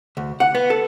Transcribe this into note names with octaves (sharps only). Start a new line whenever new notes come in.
D2
F#5
B3
A4